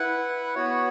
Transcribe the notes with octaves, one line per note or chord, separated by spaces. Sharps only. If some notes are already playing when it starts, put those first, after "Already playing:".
Already playing: E4 B4 F#5
B3 F#4 C#5